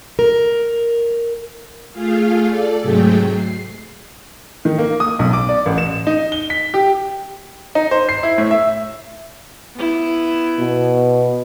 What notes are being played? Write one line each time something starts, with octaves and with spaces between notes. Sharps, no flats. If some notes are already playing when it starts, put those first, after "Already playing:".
A#4
A3 F4 G#4 F5
A4 D5
G#2 C3 F#3 A3 G#4 G5
C7
D#3
A#3
D#6
B1
D6
D5
A1
E7
D#4
G7
B6
G4
D#4
C5
C7
E4
A2
E5
B3 E4
B2